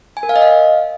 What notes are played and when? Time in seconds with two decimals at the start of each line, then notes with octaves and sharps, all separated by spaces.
0.17 G#5
0.23 A#4
0.29 F5
0.36 D#5
0.42 F5